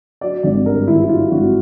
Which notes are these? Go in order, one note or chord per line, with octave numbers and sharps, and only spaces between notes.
F#3 D5
G#1 D5
G2 A#4
D#3 E4
E4
F#3 F4
G#1 F#4